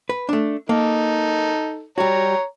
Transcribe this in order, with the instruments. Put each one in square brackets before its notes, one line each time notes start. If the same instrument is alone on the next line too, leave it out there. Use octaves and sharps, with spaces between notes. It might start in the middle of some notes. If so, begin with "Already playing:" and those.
[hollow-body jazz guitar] B4
A3 D4
[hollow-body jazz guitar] A#3 [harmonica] D#4 A4
[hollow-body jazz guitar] G3 F#4 [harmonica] C#5 A#5